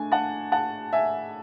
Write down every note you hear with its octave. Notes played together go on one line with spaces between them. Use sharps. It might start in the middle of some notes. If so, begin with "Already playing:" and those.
Already playing: A3 D4 G#5
F#5 A5
F#5 A5
E5 G#5